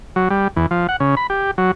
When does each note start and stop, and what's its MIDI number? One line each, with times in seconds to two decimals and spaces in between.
0.16 0.29 54
0.30 0.48 55
0.56 0.66 40
0.71 0.87 53
0.89 0.96 78
1.00 1.15 49
1.17 1.27 83
1.30 1.51 67
1.58 1.71 54